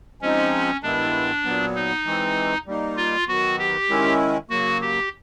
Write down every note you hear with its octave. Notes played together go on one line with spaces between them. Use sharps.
F3 G#3 C4 C#4 D#4
G2 D#3 G#3 B3 D4 E4
A#2 F#3 B3
D#4
E3 G#3 C4
G3 A#3 D#4
F4
D#3 F#3 B3 F#4
G4
D#3 G#3 C#4 E4
C#3 F#3 A#3 F#4
G4